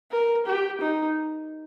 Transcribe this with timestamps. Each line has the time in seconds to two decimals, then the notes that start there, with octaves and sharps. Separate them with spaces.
0.11 A#4
0.46 G4
0.81 D#4